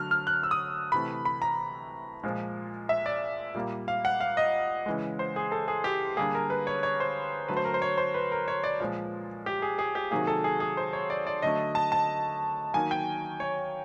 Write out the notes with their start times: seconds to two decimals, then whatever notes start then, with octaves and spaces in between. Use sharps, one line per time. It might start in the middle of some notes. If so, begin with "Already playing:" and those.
Already playing: D3 F#3 A3 F6
0.11 F6
0.27 F#6
0.43 E6
0.51 D#6
0.92 C3 E3 A3 B5
1.25 B5
1.42 A#5
2.23 A#2 F3 G#3
2.89 E5
3.06 D5
3.54 A#2 G3 A#3
3.88 F5
4.05 F#5
4.21 F5
4.37 D#5
4.86 C#3 E3 G#3
5.19 C5
5.36 G#4
5.52 A4
5.68 G#4
5.84 G4
6.17 D3 G3 A#3 G#4
6.35 A#4
6.50 B4
6.67 C#5
6.83 C#5
7.00 C5
7.48 D3 F#3 A3 B4
7.57 C5
7.65 A#4
7.74 C5
7.82 C#5
7.98 C5
8.14 B4
8.32 A#4
8.48 C#5
8.64 D5
8.80 A#2 F3 G#3
9.46 G4
9.62 G#4
9.79 G#4
9.95 G4
10.11 C3 D#3 F#3 A#3 G#4
10.27 A4
10.44 G#4
10.60 G#4
10.77 C5
10.93 C#5
11.10 D5
11.27 D5
11.42 D3 F#3 A3 D#5
11.75 A5
11.92 A5
12.73 D#3 F#3 A#3 G#5
12.91 G5
13.40 C#5